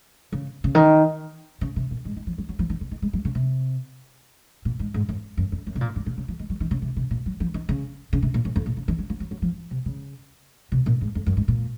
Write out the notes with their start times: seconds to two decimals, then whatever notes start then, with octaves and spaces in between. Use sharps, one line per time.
0.32 C#3
0.64 C#3
0.75 D#3
1.61 C#3
1.76 C3
1.91 A#2
2.05 G#2
2.16 D#3
2.27 F3
2.38 F#3
2.49 F#3
2.59 F3
2.70 D#3
2.81 C#3
2.91 D#3
3.02 G#3
3.13 F#3
3.25 C#3
3.35 C3
4.65 A#2
4.79 G#2
4.94 G#2
5.09 F#2
5.37 F#2
5.52 F2
5.67 F#2
5.75 C3
5.81 A#2
5.96 G#2
6.06 A#2
6.17 C#3
6.28 F3
6.39 G#3
6.50 F#3
6.60 D#3
6.71 C#3
6.82 C3
6.96 C3
7.11 A#2
7.26 F#3
7.40 F3
7.54 D#3
7.69 C#3
8.13 C#3
8.22 C3
8.34 A#2
8.45 F#2
8.56 F2
8.66 A#2
8.77 C#3
8.88 D#3
8.98 F#3
9.10 F3
9.20 F#3
9.31 F#3
9.42 F3
9.71 C3
9.86 C#3
10.72 C3
10.86 A#2
11.01 G#2
11.15 F2
11.26 F#2
11.37 G#2
11.48 A#2